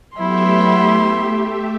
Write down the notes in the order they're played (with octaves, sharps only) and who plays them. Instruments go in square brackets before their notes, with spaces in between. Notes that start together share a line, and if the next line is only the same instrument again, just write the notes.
[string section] F#3 B3 [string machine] A3 G4 E5 [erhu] E4 [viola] C6